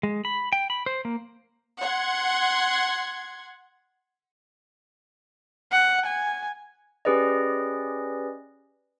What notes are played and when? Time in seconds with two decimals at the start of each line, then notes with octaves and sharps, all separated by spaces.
0.03 G#3
0.25 B5
0.53 G5
0.70 B5
0.86 C5
1.05 A#3
1.81 F#5 C6 G#6
5.72 F#5
6.06 G#5
7.05 C#4 G4 G#4 B4 D5 D#5